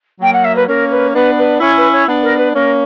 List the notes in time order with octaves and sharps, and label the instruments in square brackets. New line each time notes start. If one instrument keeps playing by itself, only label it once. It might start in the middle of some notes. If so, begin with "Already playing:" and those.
[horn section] F#3 A#3 [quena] G5
[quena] F#5
E5
B4
[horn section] A#3 C#4 [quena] A#4
[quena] B4
[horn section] B3 D4 [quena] B4
[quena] B4
[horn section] C#4 E4 [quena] C#5
[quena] B4
C#5
[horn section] B3 D4
[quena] A#4
B4
[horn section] A#3 C#4 [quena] A#4